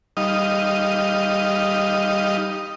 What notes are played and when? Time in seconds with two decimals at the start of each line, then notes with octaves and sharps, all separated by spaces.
0.17 G3 D#4 D#5 F5